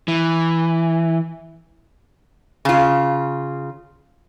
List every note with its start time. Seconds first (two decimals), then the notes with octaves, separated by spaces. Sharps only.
0.08 E3
2.65 C#3 F4